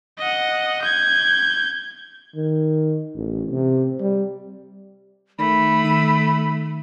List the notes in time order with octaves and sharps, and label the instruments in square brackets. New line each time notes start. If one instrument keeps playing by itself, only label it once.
[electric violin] D#5 F#5
G6 G#6
[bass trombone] D#3
A1
C3
G3
[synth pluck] D#3 [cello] A3 [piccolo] B5
[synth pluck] D#3 E6 D#7